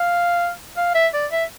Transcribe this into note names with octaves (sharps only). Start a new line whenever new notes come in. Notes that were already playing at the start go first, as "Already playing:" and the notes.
Already playing: F5
F5
E5
D5
E5